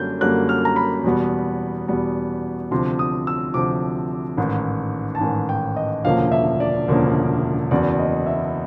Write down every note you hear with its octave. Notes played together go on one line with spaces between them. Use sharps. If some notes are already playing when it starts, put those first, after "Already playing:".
Already playing: F#2 D3 G3 A#3 G6
F#2 D3 G3 A#3 F#6
F6
A#5
B5
E2 B2 G3 B3
E2 B2 G3 B3
D2 C3 F3 C6
D#6
E6
D2 C3 F3 D6
A1 G#2 D#3
A5
A1 G#2 D#3 G#5
G5
D#5
E1 D2 C#3 F3 A#3 F5
E5
D5
E1 D2 C#3 F3 A#3
F#1 E2 B2 D5
D#5
E5